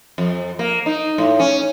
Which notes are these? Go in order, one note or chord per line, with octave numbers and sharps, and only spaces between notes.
F2
A#3
D#4
A2
C#4